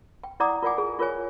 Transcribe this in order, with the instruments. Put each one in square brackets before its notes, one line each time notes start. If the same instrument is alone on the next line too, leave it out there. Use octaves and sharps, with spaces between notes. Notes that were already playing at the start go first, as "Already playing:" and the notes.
[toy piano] G5
E4 D5 F#5 A#5 D6 D#6
F4 A#4 D5 F#5 G#5 D6
G#4
F4 A#4 C#5 G#5